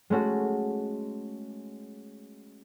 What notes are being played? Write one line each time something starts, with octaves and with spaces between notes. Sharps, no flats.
G#3 A3 C#4 F#4